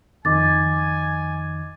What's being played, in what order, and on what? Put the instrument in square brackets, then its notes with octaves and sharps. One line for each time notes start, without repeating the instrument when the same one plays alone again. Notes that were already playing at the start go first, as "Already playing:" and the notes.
[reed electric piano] F2 D#3 [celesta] D#5 D6 A6 [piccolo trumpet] G#5